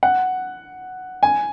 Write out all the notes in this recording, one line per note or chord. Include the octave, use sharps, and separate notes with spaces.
F#5
G#5